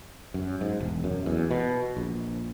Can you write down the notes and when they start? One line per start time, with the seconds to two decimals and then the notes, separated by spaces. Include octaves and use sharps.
0.34 F#2
0.61 G#2
0.80 E1
1.04 F#2
1.26 E2
1.51 B2
1.97 A#1